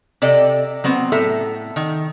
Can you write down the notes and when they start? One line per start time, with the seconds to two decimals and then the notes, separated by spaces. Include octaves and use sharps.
0.22 C3 A4 D5 D#5 G5
0.84 F#3 B3 C4
1.12 A2 A4 E5 A#5
1.76 D#3